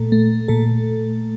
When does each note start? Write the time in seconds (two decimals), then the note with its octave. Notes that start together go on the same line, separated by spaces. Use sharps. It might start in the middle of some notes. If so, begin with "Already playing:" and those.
Already playing: A#2 A3 A4
0.12 A3
0.48 A#2 A4